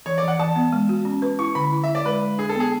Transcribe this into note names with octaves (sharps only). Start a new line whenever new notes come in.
E3 C#5
D5
E3 F#5
E3 A5
B3
G#3
F#4
C#4
B4
E4 C#6
D3 B5
E4
E4 E5
D5
G#3 B4
G#3
D4 G#4
A4
B3
G#4